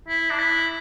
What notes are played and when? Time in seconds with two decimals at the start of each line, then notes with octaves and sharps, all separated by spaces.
0.08 E4
0.30 D4
0.39 E4